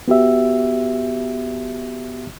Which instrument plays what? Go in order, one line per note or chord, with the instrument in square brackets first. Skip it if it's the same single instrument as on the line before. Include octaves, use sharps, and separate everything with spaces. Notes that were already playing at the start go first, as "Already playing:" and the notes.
[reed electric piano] B3 F#4 G4 E5